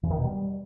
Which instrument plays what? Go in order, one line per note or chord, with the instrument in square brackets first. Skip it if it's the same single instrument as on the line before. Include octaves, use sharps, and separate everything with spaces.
[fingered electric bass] E2
D#3
B2
G3